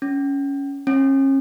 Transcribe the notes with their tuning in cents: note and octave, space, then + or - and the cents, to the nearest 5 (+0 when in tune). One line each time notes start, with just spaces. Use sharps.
C#4 +10
C#4 -35